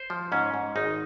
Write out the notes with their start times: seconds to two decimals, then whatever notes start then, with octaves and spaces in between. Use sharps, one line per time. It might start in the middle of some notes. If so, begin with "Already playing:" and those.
Already playing: C5
0.10 F3
0.32 G#2 C#4
0.54 G#2
0.76 G#1 D#4